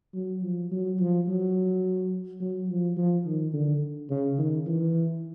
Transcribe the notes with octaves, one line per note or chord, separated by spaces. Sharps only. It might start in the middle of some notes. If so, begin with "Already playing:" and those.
F#3
F3
F#3
F3
F#3
F#3
F3
F3
D#3
D3
C#3
D#3
E3